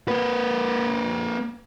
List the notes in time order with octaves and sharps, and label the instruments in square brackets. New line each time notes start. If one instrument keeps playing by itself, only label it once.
[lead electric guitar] A#3 B4